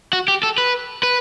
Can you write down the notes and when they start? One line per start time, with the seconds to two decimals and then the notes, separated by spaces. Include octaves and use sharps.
0.13 F#4
0.28 G4
0.43 A4
0.58 B4
1.03 B4